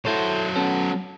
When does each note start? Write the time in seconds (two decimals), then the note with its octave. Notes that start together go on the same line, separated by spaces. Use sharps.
0.05 F#3 E4 A4 C5 C#5
0.55 B3 C#4 A4